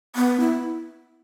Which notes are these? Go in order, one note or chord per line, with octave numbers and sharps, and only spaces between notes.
B3
E4